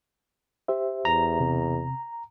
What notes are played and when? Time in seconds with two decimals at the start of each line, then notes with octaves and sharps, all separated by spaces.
0.68 G4 C5 E5
1.05 E2 A#5
1.40 C3